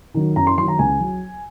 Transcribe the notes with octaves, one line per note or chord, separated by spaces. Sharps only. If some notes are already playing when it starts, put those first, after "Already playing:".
D#3 F#3
F#2 A#5
C6
D#3 F#3 C6
A#5
C#2 G#5
F#3